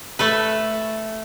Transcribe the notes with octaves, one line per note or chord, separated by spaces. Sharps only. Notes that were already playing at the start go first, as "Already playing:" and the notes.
A3 A4 B4